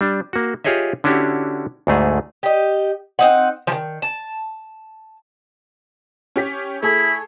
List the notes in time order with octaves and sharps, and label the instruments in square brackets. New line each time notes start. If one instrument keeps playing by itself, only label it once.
[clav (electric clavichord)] G3 D4
A#3 F#4
F4 G4 G#4 C#5 D#5 E5
D3 C#4 D4 E4 F#4 G4
D2 G#2 A3 G#4
[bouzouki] G4 D#5
C4 D#4 F#5
D#3 F3
A5
[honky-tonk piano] C#4 G4 B6
[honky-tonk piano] A3 G#4 [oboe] E4